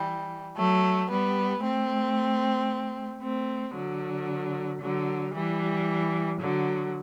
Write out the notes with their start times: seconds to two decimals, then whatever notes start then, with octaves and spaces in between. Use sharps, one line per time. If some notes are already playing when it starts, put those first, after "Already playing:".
Already playing: E3 G3
0.56 F#3 A3
1.10 G3 B3
1.63 A3 C4
3.21 A3 C4
3.74 D3 F#3
4.81 D3 F#3
5.33 E3 G3
6.39 D3 F#3